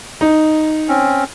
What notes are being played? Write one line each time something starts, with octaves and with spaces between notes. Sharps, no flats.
D#4
C4 C#4